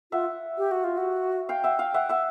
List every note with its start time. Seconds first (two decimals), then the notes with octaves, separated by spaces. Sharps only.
0.12 F4 E5 F#5
0.58 G4
0.71 F#4
0.84 F4
0.97 F#4
1.49 F5 G5
1.64 E5 F#5
1.79 F5 G5
1.94 E5 F#5
2.09 E5 F#5